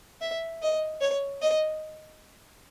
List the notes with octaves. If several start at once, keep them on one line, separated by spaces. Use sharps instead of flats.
E5
D#5
C#5
D#5